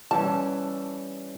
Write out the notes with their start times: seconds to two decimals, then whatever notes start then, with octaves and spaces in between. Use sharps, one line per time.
0.11 E3 G3 C#4 A5